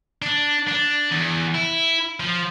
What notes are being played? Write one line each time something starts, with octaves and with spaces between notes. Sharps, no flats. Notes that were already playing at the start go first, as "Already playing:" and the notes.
D4
D4
E2
E4
F3